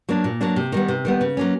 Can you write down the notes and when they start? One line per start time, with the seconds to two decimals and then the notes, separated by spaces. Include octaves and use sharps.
0.09 F#3 A#3 D4
0.24 A#2
0.41 F#3 A#3 D4
0.56 C3
0.72 D#3 G3 B3
0.88 C3
1.05 D#3 G3 B3
1.21 C#3
1.37 F#3 A#3 C#4